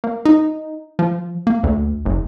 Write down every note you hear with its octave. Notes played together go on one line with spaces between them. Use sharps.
A#3
D#4
F3
A#3
D2
F#1